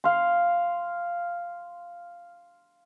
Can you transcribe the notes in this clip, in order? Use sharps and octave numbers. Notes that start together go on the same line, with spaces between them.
F5 C6